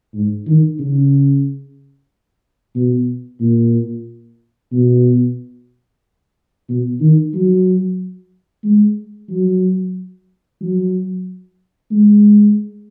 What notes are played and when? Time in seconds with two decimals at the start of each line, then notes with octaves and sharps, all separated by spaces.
0.14 G#2
0.47 D#3
0.79 C#3
2.75 B2
3.40 A#2
4.72 B2
6.69 B2
7.01 D#3
7.34 F#3
8.64 G#3
9.29 F#3
10.61 F#3
11.91 G#3